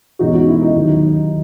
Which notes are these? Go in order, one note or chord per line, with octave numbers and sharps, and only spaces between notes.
E2 B2 G#3 C#4 D#4 F#4
D#4 F#4
E4
D#4
D#2 D#3 F#3